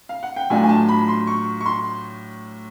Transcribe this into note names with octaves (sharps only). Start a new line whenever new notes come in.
F5
F#5
G5
A2 F#3 A3 D4 F4 G#5
G#5
A5
B5
C6
C#6
C#6
C6